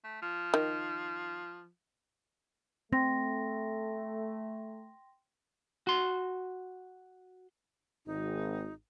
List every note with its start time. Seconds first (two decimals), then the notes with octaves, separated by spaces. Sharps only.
0.04 A3
0.22 F3
0.54 D#3
2.93 A3 C4 G5 C6 A#6
5.87 F#4 C6
8.06 G#1 D#4